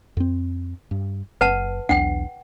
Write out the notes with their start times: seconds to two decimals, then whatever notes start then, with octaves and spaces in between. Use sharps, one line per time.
0.17 F2 C4
0.91 G2
1.41 F#1 B4 F#5 A5
1.89 B1 E2 D4 F#5 G5